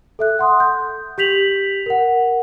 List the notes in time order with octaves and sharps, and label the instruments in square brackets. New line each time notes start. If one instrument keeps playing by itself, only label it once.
[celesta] A4 E5 F#6
F#5 C6 D#6
G6
G4 G6 B6 F7 F#7
A#4 F#5